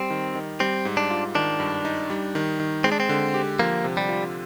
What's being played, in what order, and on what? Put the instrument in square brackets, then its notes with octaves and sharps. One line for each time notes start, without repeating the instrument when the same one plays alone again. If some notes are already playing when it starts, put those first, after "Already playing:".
Already playing: [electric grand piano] G3 [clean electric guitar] C4
[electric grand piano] D#3
D#3
[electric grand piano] G3 [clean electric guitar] C4
[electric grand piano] G#2
[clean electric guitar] D4
[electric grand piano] F4
[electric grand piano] D#3 [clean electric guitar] D4
[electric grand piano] G2
D#4
G3
D#3
D#3
[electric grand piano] G#3 [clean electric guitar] C4
[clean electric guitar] D4
C4
[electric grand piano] D3
G4
[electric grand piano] F3 [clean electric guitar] A#3
[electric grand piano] C3
[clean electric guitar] G3
[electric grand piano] F4